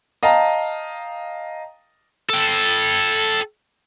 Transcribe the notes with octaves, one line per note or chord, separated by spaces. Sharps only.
D#5 F5 G5 A5 A#5
A4 G5